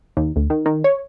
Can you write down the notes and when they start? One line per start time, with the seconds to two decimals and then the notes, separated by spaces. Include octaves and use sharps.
0.17 D#2
0.36 D2
0.50 D#3
0.66 D#3
0.84 C#5